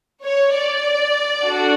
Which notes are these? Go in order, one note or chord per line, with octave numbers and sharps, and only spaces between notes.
C#5
D5
D4 F#4 A4